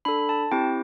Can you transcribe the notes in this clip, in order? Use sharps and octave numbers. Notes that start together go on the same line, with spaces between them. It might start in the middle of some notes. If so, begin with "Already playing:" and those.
D4 A4 B5
A5
C4 E4 G4 G5